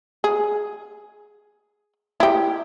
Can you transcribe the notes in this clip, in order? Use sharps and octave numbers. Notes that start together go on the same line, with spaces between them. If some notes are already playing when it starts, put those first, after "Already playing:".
G#4
E4 G4